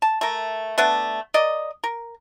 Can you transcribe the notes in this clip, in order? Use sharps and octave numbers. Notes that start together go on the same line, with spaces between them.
A5
A3 A#4
A3 B3 D4
A#4 D5 D#5
A#4